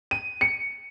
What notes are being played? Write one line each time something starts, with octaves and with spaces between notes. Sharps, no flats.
D#7
C#7